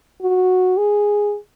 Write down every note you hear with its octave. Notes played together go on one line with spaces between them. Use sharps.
F#4
G#4